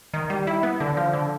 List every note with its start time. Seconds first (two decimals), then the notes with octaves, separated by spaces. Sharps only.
0.14 D#3
0.30 G3
0.47 E4
0.63 B3
0.80 D3
0.97 F3
1.13 D3